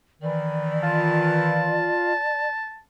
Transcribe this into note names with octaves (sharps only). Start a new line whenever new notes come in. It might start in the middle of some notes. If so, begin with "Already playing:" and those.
D#3 E3 D5
F4 A5